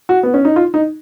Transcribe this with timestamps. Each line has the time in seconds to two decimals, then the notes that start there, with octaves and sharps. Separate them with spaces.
0.09 F#4
0.23 B3
0.34 C#4
0.45 D#4
0.56 F4
0.74 D#4